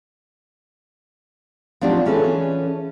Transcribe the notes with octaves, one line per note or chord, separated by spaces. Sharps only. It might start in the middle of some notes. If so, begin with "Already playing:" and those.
F3 F#3 C4 D4 D#4 G4
E3 C#4 G#4 A4 B4